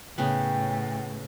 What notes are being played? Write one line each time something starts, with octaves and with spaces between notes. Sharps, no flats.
A2 C#3 B3 B4 G5